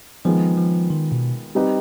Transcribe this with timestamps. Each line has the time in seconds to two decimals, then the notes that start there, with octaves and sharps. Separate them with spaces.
0.25 D#3 F3 G#3 B3 F4 G#4
0.57 F3
0.90 D#3
1.12 B2
1.55 G3 C4 D#4 G4 B4